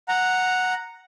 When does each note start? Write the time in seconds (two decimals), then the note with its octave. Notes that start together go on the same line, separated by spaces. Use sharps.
0.08 F#5 A#5